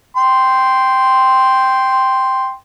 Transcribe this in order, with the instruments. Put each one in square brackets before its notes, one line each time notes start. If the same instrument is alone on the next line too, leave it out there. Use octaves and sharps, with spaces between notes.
[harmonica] G5 C6